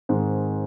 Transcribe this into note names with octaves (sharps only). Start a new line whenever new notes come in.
G#2 D#3 G#3 C4